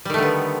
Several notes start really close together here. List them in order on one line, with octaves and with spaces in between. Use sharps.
G3 D#3 A3 D3 B3